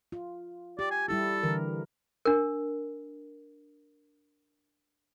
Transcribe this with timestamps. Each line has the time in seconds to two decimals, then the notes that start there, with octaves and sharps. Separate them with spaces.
0.12 F4
0.79 G4 D5
0.91 G#5
1.08 G3 E4 G4 A4
1.43 D3 E3 A#4
2.25 D4 A#4